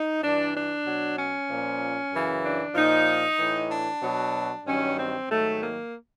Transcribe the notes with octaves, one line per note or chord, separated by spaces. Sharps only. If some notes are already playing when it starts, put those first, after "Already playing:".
Already playing: D#4
G2 E3 D4
D4
B2 F#3
C#4
A#2 F3
F#2 C#3 E3
D4
A#2 F3 D#4
A2 E3
D4
B2 F#3
G2 D#3 F#3 C#4
C4
G#2 D#3 F#3 A3
A#3